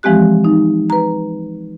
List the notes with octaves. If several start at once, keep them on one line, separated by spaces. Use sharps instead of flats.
E3 F3 G#3 C4 G4 F#6
D#4
B4 A#5